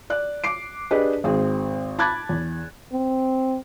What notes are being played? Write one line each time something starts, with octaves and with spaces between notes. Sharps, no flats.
D5 F#6
D6 C7 D7
D4 G4 G#4 B4 D5 D#5
G#1 C4 G#4
A5 B5 D6 F#6 G#6 A6
E2
C4